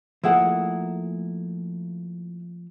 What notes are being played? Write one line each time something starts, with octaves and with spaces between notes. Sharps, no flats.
F3 A3 A#3 E4 G#4 F#5